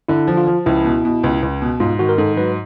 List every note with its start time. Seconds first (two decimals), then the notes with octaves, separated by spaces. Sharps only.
0.08 D3 E4
0.28 F3
0.37 F4
0.47 F3
0.66 C#2 E4
0.85 B2
1.05 B2
1.24 C#2
1.42 C#2
1.62 B2
1.80 G#2 F4
1.99 D#3 F#4
2.09 A#4
2.18 G#2 A4
2.37 F#3 B4